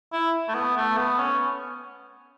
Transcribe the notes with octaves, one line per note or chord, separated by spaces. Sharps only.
E4
A3
B3
A3
B3
C#4